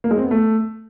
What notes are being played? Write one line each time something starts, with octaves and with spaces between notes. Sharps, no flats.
A#3
G#3
C4
B3
A3